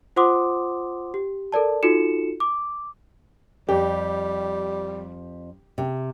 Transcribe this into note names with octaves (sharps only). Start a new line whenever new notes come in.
F4 C5 F#5 C6 D6 D#6
G4
A4 A#4 D5 A5
D#4 F4 F#4 A4 C#7 E7
D6
F2 G3 G4
C3